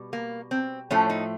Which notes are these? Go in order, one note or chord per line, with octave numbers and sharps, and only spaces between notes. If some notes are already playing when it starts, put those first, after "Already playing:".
Already playing: B2 G3
A#3
C4
A2 F3 A3 C#4
D#4